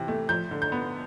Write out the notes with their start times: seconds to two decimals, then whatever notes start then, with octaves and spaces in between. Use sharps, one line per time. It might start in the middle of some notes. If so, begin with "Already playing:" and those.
Already playing: C3 E3
0.08 A3
0.29 F3 G6
0.51 D3
0.62 G6
0.72 B3